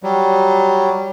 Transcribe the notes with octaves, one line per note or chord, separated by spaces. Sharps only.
F#3 G3